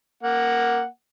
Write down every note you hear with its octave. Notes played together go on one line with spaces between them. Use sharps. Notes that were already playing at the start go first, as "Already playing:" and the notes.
A#3 F#5